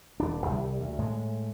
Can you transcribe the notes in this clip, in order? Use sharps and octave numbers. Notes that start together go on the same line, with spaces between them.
D#1 D4
C2 F#3 G3
D2
A2 G#3